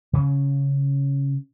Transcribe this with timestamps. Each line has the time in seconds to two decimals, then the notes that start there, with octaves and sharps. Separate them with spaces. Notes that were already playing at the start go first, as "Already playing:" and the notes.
0.13 C#3 C#4